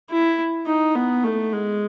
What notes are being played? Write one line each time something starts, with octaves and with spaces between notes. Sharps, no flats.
E4
D#4
B3
A3
G#3